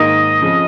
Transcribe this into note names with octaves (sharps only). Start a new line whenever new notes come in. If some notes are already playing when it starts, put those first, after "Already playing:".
Already playing: G#2 D#3 A#3 D#4 D#5
F2 C#3 F3